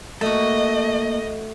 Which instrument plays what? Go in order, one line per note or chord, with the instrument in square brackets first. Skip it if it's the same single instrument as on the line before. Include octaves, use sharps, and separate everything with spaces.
[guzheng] A3 F#4 [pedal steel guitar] A#3 A5 [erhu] D#5